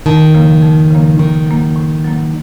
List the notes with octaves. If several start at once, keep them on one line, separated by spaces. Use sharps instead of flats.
F2 D#3
C#3 F3 A#3
F2
C#3 F3 A#3
A2 D#3
F#3 A#3
A2
F#3 A#3